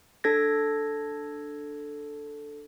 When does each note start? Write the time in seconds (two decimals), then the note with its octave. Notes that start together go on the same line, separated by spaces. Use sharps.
0.24 D4 A4 G#6 A#6